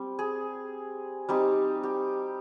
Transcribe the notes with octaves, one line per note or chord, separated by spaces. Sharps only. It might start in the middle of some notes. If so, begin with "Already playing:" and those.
Already playing: G3 C4
G#4
G3 C4 D#4 G4
G4